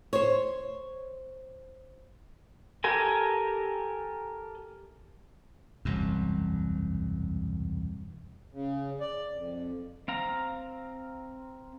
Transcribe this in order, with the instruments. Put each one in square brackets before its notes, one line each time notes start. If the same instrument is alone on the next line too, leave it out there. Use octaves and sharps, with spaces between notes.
[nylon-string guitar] C5 C#5
[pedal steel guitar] G4 A4 A#4 G#5
[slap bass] E1 C2 F#2
[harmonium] C#3
D5
F2
[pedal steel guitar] C4 F5 A#5